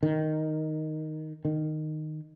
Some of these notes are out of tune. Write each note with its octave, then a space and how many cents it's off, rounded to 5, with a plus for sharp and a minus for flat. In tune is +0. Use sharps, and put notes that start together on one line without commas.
D#3 +0
D#3 -10